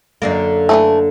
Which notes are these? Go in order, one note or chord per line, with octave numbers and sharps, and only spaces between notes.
F#2 D3 A#3
E3 F#3 A3